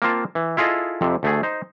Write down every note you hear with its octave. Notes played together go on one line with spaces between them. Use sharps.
A#3 C4 F4 A5
E3
E4 F4 G#4 A4 D#5
F2 C3
D2 A3 G#4
D#4 C5